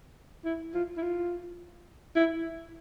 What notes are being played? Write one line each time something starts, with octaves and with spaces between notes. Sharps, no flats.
E4
F4
E4
F4
E4